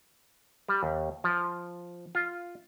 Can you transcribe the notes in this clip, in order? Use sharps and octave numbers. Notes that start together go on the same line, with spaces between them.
G3
D#2
F3
F4